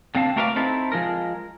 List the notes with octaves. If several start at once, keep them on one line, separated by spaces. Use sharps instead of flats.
D3 C4 F5 A5
A3 F#4 A#4 B4 D5 F5
C4 D#4 E4 A4
F3 G#3 A#4